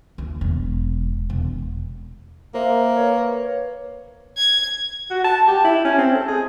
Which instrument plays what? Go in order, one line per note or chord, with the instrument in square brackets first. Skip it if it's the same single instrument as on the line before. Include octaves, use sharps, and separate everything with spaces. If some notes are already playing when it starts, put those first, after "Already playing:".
[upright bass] D#2
E1
E1
[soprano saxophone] A#3 [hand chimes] A#4 C5 E5
[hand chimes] B4 [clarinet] C#5
[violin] G#6
[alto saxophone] F#4
A5
G4
E4
C#4
C4
A4
G#4